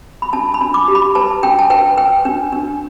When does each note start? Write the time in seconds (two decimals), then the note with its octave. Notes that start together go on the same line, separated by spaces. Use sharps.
0.22 B5
0.33 D4 A5
0.54 B5
0.61 D4
0.74 D6
0.88 G4
0.95 B5
1.15 B4 A5
1.43 D4 G5
1.59 A5
1.70 B4 G5
1.97 B4 G5
2.25 D4
2.52 D4